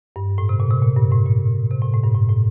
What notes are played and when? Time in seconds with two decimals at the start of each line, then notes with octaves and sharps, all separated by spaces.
0.16 G2
0.38 A2
0.49 C3
0.60 A#2
0.71 C3
0.82 A#2
0.96 G2
1.12 A2
1.26 A#2
1.71 C3
1.82 A2
1.93 A2
2.04 G2
2.15 A2
2.29 A2